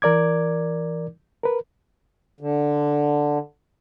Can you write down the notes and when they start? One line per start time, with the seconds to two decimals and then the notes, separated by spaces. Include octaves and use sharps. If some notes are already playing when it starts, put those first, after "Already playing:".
0.02 E3 A#4 D5 D6 G#6
1.43 A#4 B4
2.41 D3